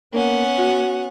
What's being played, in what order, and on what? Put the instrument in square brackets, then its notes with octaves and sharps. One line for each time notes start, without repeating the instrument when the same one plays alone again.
[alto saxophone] A#3 [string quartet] B3 C#4 F#5
[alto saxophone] F#4